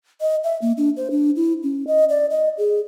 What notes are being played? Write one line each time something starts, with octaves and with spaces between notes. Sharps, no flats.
D#5
E5
A#3
D4
C5
D4
E4
C#4
D#5
D5
D#5
G#4